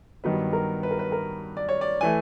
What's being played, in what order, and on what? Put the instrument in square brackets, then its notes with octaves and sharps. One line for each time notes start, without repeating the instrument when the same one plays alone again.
[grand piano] G2 D#3 F#3 B3 B4
A#4
B4
A#4
B4
A#4
D5
C#5
D5
E3 A3 G#5